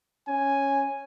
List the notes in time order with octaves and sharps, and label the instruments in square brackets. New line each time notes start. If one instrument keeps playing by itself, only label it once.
[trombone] C#4 [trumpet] G#5